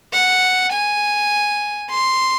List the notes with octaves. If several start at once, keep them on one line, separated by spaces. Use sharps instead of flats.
F#5
G#5
C6